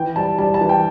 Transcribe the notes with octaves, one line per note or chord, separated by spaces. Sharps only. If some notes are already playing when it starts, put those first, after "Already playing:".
Already playing: E3 G5
G3 A5
G3 A5
A5
E3
G5